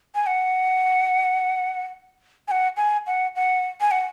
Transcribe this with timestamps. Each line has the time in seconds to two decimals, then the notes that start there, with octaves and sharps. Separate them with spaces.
0.15 G#5
0.26 F#5
2.48 G#5
2.51 F#5
2.77 G#5
3.07 F#5
3.36 F#5
3.81 G#5
3.91 F#5